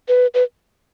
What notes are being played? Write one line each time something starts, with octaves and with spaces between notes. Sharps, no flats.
B4
B4